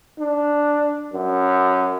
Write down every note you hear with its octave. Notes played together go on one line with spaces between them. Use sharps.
D4
F#2